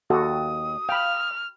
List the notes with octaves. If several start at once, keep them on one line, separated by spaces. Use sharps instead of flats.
D#2 F#4 A4 D#6
F5 G5 B5 F6